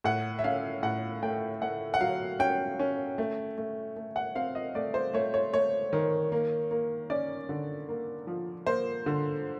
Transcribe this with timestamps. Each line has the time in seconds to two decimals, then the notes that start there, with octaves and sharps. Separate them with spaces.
0.04 A2 F#5
0.39 E5
0.44 C#4 F5
0.83 A2 F#5
1.22 A3 G5
1.62 A3 F#5
1.94 F#5
2.00 F#3 F5
2.39 C#4 G5
2.79 C#4
3.18 A3
3.58 A3
3.96 A3
4.16 F#5
4.35 C4 F5
4.55 D#5
4.75 A3 D5
4.94 C5
5.14 A3 C#5
5.34 C#5
5.54 A3 C#5
5.93 D#3
6.32 A#3
6.71 A#3
7.10 C#4 D5
7.49 D3
7.89 A#3
8.27 F3
8.67 A#3 C5
9.06 D3